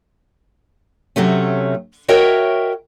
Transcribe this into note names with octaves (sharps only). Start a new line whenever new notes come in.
C3 F#3 A3 C#4
F#4 A#4 C#5 D#5 E5 G5